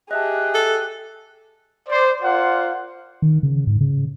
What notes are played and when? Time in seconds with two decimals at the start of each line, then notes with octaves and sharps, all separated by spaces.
0.11 G4 G#4 D#5 E5 A5 F#6
0.54 A4
1.89 C5 D5
2.22 F4 A#4 C5 D5 F#5
3.22 D#3
3.43 C#3
3.67 G#2
3.81 C#3